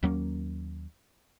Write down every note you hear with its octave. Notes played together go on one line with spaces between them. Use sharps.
D#2 F#3 A#3 C#4